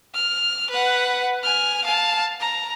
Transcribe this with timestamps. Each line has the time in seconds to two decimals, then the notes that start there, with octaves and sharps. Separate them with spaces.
0.14 F6
0.70 B4 F#5
1.43 G#5 F6
1.84 F5 A5
2.40 A#5